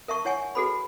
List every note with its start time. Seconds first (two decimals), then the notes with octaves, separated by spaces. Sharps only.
0.08 A#4 E5 A5 C#6
0.25 E4 C#5 F#5 G#5 C#6
0.55 F#4 G#4 A4 B4 B5